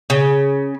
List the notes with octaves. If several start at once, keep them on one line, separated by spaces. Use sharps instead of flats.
C#3